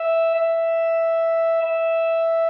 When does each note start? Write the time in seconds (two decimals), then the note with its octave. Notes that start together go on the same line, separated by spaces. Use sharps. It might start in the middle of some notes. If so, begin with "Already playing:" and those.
Already playing: E5
0.34 E5
1.62 E5